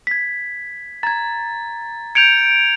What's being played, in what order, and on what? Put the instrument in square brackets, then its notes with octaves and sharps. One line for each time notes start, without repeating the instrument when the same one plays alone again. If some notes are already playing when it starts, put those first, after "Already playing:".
[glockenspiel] G#6 B6
[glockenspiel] A#5 G#6 [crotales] A6
[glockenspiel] G6 C#7 [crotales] G#6 D7 F7